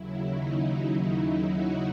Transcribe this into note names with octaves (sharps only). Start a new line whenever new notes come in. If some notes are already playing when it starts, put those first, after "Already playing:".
Already playing: D#2 C#3 F#3 E4
D#4
D#4 F#4